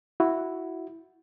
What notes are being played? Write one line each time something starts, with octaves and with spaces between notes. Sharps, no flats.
E4 F#4